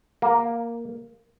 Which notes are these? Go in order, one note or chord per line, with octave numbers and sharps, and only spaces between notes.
A#3